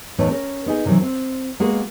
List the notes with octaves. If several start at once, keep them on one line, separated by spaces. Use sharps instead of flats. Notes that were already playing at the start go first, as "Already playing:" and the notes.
E2 A2 B3 D#4 B4 C#5
C#4 A#4
B3 D#4 G#4
C3 D#3 E3 F#3
C4
G#3 A#3 B3 F#4 G#4 A#4